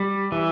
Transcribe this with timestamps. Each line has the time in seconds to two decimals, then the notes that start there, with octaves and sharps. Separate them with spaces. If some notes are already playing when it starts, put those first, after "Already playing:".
Already playing: G3
0.32 E3